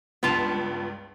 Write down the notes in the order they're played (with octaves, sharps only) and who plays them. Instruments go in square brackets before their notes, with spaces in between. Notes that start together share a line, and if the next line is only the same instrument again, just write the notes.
[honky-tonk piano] C#2 G2 [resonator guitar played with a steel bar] B3 F4 A5